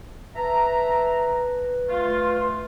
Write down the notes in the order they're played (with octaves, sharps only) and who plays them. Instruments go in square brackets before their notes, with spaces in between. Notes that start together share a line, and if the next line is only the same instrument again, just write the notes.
[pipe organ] B4 [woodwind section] E5 A5 A#5
[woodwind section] A3 F4